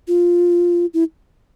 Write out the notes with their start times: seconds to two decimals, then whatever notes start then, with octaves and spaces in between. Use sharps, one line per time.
0.08 F4
0.94 E4